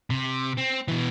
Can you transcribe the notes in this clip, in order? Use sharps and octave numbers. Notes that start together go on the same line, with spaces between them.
C3
C4
B2 E3